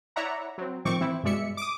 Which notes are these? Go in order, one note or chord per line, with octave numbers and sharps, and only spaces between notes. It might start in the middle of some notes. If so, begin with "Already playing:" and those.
E4 C#5 D5 E5 F#5 A#5
F#3 C4
A2 D#3 F3 C4 C#6 D6
E3 C4 E4
G2 B2 G#3 D5 E5 C#7
D6 D#6